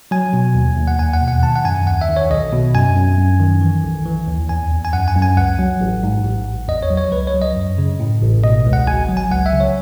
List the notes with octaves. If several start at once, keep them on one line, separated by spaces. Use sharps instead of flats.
F#3 G#5
B2
D#2
D#2
F#5
E2 G#5
F#5
B2
F#5
D#3 A5
F#5
F#2 G#5
D#2 F#5
E5
D#3
C#5
B1 D#5
B2
F#2 G#5
F#2
F#2
D#3
E3
B1
E3
D#2
E2 G#5
E2
G#5
F#2 F#5
G#5
F#2
G#5
C#2 F#5
F#3
A1
G#2
A1
A1
E2 D#5
C#5
F#3
C#5
C#2 B4
C#5
F#3
D#5
F#2
C#3
A2
A1
B2 D#5
C#2
F#5
G#1 G#5
F#3
G#5
C#2 F#5
E5
C#3
C#5